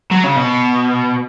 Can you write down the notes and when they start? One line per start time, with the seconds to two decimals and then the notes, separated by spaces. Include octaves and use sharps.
0.12 F#3
0.24 C#3
0.36 B2